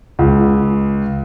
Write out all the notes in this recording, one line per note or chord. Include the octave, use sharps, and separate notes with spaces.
C#2